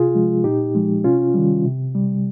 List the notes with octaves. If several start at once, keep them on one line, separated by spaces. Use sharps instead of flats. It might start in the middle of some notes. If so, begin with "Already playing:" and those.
Already playing: C3 F4 G#4
F3 G#3
A#2 D#4 G4
F3 G#3
C3 C#4 F4
D#3 G3
C3
G3